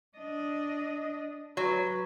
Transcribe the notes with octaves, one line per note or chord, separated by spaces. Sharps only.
D4 D#5
F#3 B4